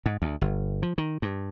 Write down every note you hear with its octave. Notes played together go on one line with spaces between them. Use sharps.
G#2
D2
G1
F3
D#3
G2